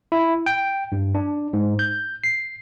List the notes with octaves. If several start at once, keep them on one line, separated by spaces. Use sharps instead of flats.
E4
G5
G2
D4
G#2
G6
C7